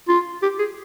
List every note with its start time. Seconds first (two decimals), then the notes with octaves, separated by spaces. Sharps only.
0.08 F4
0.42 G4
0.59 G#4